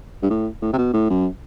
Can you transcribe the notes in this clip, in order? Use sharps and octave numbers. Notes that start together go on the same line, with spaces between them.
G2
A2
A2
C3
B2
A2
F#2